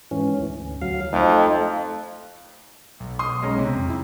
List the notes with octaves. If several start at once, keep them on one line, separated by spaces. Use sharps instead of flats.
G#2 E3 C#4
D2
D2 F#3 F5
F2 A3 D#4
B1
C6 D#6
G#3 C#4 A#5
C3
F2
E4